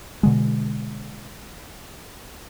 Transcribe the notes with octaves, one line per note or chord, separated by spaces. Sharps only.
B2 D3 G#3